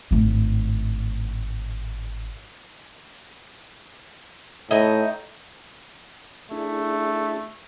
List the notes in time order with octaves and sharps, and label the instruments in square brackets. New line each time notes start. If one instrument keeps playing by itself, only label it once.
[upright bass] G#1 A2
[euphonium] A2 [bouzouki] D#4 E4 D#5
[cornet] A3 [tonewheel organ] D4 E4 G#4